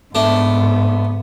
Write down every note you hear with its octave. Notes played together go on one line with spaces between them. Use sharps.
G#2 A3 B3 D4